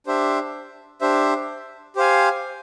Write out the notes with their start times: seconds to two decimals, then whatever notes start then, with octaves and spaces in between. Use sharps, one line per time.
0.07 D4 G4 C5 E5
1.01 D4 G4 C5 E5
1.96 G4 C5 F5 G#5